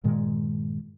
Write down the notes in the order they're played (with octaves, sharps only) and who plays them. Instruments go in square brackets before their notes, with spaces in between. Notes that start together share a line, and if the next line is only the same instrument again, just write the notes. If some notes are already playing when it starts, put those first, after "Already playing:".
[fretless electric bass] G2 A#2 D#3 G#3